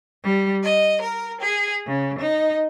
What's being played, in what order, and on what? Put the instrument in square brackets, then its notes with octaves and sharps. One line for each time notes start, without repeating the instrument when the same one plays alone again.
[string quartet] G3
D#5
A#4
G#4
C#3
D#4